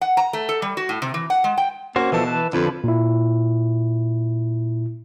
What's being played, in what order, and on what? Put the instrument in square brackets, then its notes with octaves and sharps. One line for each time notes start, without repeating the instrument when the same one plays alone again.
[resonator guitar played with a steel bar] F#5
A#5
A3
A4
G3
F#4
A2
C3
E3
F#5
G#3
G5
[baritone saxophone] A#3 [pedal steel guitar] C#4 F#4 C5
[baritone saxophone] B2 [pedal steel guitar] E3 F3 A4
[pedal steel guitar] E3 B4 A5
[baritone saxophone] F2 [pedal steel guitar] D3 F3 B4
[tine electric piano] A#2 E4